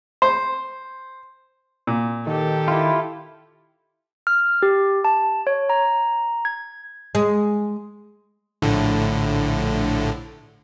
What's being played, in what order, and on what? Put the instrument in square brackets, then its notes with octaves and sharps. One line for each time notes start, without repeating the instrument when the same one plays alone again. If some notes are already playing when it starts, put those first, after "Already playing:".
[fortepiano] C5
A#2
[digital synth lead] D#3 [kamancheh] G4 A4
[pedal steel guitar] E4 F4
[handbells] F6
G4
A5
C#5
A#5
G#6
[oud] G#3
[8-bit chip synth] A#1 A2 D3